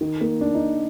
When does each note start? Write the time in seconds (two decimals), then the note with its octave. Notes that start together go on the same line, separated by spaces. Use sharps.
0.01 D#3
0.21 A#3
0.41 D4
0.54 D#4